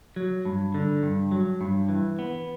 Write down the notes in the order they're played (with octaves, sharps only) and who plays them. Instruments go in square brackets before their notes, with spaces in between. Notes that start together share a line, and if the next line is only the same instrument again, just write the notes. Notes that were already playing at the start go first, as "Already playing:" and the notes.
[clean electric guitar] F#3
G2
D3
G2
F#3
G2
E3
B3